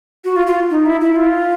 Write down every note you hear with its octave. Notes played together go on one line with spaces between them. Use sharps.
F#4
F4
F4
D#4
E4
E4
F4